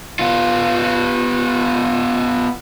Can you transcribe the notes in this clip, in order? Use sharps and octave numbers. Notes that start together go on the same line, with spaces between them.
B3 F4